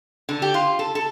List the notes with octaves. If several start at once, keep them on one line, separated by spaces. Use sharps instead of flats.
D3
G4
F4
A4
A4